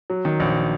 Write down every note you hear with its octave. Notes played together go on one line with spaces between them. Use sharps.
F#3
D#3
A#1